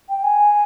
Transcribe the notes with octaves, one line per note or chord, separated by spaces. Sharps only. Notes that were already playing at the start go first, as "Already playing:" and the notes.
G5
G#5